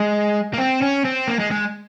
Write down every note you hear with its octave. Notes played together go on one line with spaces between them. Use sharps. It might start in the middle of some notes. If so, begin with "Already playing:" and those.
Already playing: G#3
A#3
C4
C#4
C4
A#3
G#3
G#3